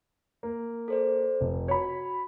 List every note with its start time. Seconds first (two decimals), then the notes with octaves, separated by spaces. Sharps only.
0.43 A#3
0.88 A4 C5 D5
1.41 F1
1.68 F#4 C#5 B5